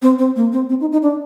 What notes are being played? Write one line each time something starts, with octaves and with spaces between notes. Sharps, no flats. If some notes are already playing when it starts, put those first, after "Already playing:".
C4
C4
A#3
C4
C4
D#4
D#4
D4